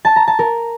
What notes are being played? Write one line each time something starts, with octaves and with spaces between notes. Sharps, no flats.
A5
A#5
A5
A#4